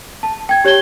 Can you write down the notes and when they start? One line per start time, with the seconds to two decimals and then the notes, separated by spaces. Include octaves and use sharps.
0.23 A5
0.49 G5 G#6
0.64 G4 C#5 G#6 G7